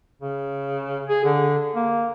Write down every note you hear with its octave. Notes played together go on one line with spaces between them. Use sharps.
C#3
G#4
D3
A#3